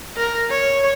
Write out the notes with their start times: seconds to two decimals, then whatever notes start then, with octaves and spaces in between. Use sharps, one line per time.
0.17 A#4
0.51 C#5